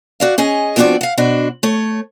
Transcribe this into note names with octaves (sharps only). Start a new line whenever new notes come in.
F#4 D5 F5
C#4 G#4 D#5
F3 B3 C4 D4 F#4 D5
F5 F#5
B2 D4 F#4 C5
A3 C#5